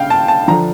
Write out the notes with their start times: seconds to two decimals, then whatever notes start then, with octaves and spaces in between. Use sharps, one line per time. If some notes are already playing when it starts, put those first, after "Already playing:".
Already playing: C#3 F5 G5
0.10 A5
0.28 A5
0.48 D3 F3 A#5